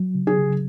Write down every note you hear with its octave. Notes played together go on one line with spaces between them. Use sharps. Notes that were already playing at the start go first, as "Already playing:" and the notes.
Already playing: F#3
C#3
G#4
C#3